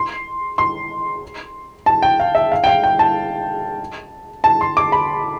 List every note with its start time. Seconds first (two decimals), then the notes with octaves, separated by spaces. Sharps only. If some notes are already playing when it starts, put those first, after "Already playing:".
Already playing: C6
0.58 C6
1.86 A5
2.02 G5
2.20 F5
2.35 E5
2.52 F5
2.64 G5
2.67 F5
2.83 G5
2.99 A5
4.44 A5
4.61 C6
4.77 D6
4.92 B5